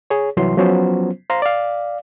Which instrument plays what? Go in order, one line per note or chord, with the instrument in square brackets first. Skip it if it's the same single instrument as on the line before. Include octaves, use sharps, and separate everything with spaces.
[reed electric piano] G#4 C#5
C2 E3 F#3 C6
F3 F#3 B3 C#4 F4 C5
C5 F5 A#5 C6
D5 F5